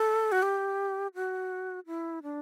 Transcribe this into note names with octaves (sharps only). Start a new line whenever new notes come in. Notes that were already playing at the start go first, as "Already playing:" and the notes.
Already playing: A4
F#4
G4
F#4
E4
D4